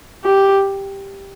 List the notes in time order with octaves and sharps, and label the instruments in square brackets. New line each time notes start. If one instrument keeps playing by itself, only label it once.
[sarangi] G4